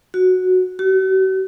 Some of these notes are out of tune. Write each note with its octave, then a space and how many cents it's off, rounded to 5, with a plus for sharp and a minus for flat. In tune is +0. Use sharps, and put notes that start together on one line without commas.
F#4 -5
F#4 +45